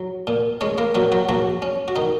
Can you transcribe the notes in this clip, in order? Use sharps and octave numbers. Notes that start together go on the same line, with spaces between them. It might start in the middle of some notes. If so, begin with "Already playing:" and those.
Already playing: F#3
A#2
G#3 C#4 C#5
A#3 A#4
A#2 F#3 F#4
F#3 F#4
A#1 F#3 F#4
C#4
F#4
D#3 D#4